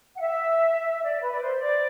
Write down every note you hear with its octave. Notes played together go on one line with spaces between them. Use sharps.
F#5
E5
E5
D5
B4
D5
C5
D5